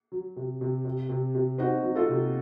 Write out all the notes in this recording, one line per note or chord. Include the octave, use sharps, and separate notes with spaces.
F#3
C3
C3
C3
C3
C3
C4 D#4 F#4
F#3
F4 A4
C3